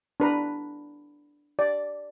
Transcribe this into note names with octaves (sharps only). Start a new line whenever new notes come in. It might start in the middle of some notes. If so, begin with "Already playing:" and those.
D4 B4 A#5
D5